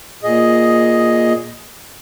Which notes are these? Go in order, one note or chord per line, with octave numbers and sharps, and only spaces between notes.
A#2 G#4 D#5